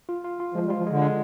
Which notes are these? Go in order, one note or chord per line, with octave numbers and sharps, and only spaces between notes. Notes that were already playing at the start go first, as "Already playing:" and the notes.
F4
F4
F4
F3 G#3
G3
F4
F3
D3 G#3
G#3